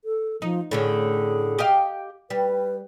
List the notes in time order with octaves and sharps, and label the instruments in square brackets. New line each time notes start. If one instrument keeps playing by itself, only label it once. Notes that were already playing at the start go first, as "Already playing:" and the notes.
[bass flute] A4
[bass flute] F3 [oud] D#4
[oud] A2 D3 C#4 [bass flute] G#4
[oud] G4 D#5 F5
[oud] G3 [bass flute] B4